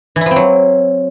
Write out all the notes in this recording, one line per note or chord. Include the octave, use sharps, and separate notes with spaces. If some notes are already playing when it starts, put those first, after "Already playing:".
E3
E4
F3
C4
F#3